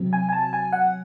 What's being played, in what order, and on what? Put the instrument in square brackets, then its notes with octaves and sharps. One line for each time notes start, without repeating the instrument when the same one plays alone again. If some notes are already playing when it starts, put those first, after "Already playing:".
Already playing: [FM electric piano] C3 F#3 C4
G#5
G#5
A5
G#5
F#5